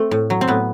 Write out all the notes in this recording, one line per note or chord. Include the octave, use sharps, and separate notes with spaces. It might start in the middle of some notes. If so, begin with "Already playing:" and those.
Already playing: A3 C4
A2
F#3
C4
A2 B3